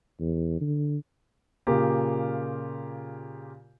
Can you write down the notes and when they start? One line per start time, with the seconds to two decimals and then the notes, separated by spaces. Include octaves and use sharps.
0.20 E2
0.61 D3
1.67 A#2 C#3 A#3 F4 G4 A#4